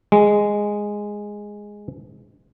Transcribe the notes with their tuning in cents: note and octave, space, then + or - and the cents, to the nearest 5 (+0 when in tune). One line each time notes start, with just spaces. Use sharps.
G#3 -5